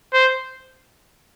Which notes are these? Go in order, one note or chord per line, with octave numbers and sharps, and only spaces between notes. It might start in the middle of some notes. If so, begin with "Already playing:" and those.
C5